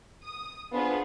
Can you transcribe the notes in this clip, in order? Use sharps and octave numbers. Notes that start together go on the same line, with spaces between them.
D#6
B3 D4 F4 G#4 B4 C5